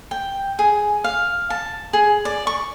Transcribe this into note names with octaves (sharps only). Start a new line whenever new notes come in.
G5
G#4
F5
A5
G#4
D5
C#6